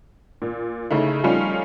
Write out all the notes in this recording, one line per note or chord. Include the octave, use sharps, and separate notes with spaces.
A#2
C#3 A3 D#4 E4
F3 G3 A3 C#4 D#4 F4